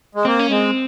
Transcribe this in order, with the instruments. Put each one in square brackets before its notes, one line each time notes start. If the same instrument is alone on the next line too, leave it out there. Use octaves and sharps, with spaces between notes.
[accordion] G#3
[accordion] A#3 [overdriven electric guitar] C4
[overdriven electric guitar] C#4
[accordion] G#3 [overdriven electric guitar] C4